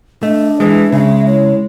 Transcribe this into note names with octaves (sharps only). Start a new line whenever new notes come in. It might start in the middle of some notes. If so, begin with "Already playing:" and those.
A3 D4 D#5
E3 G#3 B4
C#3 G#3 E5
E4 C#5